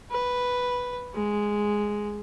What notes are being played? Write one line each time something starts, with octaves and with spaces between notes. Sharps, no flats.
B4
G#3